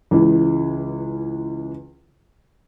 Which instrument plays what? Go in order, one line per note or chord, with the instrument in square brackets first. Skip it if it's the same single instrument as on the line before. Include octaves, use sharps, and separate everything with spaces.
[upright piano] C#2 E3